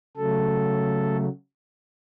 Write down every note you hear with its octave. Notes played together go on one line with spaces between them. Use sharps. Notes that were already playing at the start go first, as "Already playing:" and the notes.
C#3 F#3 A3 A4